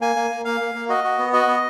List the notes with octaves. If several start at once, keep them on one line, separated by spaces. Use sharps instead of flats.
A#3 G#5
A#3
A#3
A#3 F5
A#3
A#3
F#4 D#5
F#4
B3
F#4 D#5
B3